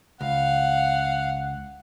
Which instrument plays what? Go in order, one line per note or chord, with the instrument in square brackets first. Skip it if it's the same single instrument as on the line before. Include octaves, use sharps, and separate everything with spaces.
[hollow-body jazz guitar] C#2 [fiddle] F5 [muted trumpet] F#5